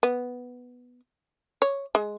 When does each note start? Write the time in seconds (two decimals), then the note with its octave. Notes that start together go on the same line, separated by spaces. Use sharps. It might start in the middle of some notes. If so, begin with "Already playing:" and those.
0.03 B3
1.62 C#5
1.95 G#3